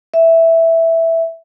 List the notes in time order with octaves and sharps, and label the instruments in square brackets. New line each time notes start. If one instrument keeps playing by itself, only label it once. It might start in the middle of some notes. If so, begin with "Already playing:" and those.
[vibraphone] E5